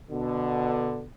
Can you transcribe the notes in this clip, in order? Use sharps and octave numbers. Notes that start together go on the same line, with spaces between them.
B2 D3